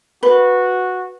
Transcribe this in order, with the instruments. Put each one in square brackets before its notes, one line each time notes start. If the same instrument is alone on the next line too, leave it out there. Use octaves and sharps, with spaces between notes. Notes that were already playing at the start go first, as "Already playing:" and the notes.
[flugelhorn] F#4 [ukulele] B4